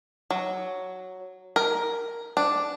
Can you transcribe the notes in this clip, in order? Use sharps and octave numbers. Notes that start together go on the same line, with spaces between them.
F#3
A#4
D4